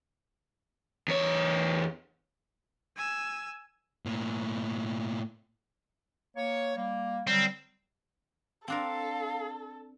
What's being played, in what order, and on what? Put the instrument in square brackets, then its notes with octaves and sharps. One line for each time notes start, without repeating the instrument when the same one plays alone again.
[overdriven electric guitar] E2 C#5
[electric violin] G#5 E6
[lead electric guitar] A2 A#3
[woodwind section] A#3 C#5
G3 A#3
[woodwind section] D3 F#3 G3 [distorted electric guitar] C4
[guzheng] C4 D4 A#4 [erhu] A4 [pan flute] F5